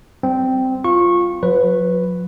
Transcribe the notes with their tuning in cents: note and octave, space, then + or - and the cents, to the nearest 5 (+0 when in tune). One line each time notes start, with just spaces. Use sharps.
G3 +0 C4 -10
F4 +0 C#6 -20
F#3 -45 B4 +0